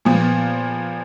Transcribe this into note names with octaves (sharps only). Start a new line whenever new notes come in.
A#2 F3 B3